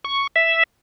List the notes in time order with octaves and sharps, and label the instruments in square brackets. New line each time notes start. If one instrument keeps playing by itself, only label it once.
[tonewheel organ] C#6
E5